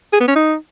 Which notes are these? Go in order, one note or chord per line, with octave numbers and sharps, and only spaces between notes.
G#4
B3
C#4
D#4